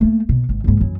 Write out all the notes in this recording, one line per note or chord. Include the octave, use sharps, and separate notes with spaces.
A3 A#3
B2
G#1
C#2 G#2
F#2 E3